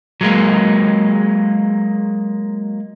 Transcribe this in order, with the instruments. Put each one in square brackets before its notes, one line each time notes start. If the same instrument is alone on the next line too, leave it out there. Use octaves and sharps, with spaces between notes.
[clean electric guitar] F#3 G#3 A#3